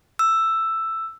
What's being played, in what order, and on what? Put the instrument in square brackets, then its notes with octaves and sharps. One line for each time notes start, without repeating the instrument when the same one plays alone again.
[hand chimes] E6